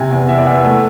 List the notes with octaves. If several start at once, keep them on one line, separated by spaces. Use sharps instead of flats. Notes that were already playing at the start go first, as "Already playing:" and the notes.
Already playing: C3 G#5
E2
E2 E5
D5
E2 E5
A3